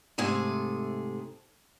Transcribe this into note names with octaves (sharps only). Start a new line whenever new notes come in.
G#2 C3 A3 G#4